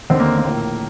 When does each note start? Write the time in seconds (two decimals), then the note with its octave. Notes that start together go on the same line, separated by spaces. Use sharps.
0.10 D#2 D3 C4
0.20 A#3
0.38 A#3
0.46 A#1 A2